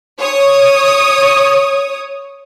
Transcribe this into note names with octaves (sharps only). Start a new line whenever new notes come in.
C#5 D#6